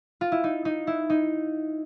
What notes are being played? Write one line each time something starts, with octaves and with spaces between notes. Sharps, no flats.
F4
E4
D#4
D#4
E4
D#4